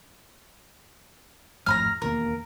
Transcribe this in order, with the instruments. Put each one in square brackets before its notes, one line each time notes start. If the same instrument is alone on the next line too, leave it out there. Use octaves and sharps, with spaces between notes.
[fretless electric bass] G#1 F2 A2 [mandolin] A#5 B5 F6
[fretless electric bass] E1 D#2 A#3 [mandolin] A#4